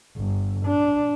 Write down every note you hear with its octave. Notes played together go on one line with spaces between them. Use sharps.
G1
D4